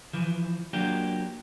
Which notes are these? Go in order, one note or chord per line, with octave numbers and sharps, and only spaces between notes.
E3 F3
F#3 A#3 D4 F4 G4